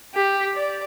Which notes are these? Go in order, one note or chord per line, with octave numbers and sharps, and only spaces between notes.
G4
D5